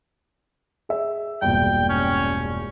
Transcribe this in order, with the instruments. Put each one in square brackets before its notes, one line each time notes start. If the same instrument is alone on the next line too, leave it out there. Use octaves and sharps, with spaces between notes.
[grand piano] G#4 E5
[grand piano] E1 A#1 G2 [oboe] G5
[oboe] C#4